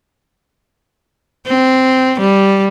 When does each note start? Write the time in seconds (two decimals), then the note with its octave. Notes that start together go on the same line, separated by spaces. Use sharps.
1.47 C4
2.20 G3